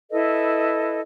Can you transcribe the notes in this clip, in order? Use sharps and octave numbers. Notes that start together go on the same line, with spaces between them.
E4 A4 B4 D#5